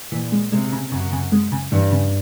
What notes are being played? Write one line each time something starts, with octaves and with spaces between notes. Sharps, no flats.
A#2 E3
G#3
C3 G#3
C#3
F#2 C#3
C#3
G#3
C#3
G2 E3
C#3